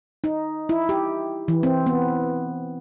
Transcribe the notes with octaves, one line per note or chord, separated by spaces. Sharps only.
D#4
E4
G4
E3
C4
B3